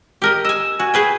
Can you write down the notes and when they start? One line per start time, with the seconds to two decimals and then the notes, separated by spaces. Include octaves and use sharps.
0.22 G4 A#4 D#5
0.45 D#5 G#5 E6
0.79 F#4 G#5
0.94 G#4 B4 G5